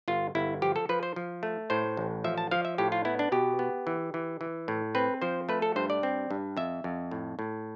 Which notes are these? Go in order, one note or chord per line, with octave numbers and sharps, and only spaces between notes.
G1 F4
G1 E4
F3 G4
A4
F3 B4
C5
F3
A3
A2 C5
A1
F3 E5
A5
F3 F5
E5
A2 G4
F4
B3 E4
D4
B2 G4
B3
E3
E3
E3
A2
C4 B4
F3 C5
A3 B4
A4
G2 C5
D5
C4
G2
F2 E5
F2
A2
A2